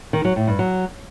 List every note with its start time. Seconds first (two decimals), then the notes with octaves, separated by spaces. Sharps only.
0.13 D#3
0.25 F#3
0.36 A2
0.47 G2
0.59 F#3